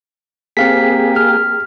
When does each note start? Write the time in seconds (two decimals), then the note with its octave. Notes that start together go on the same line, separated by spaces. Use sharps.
0.57 A#3 C4 G4 G#4 F5 B6
1.16 F6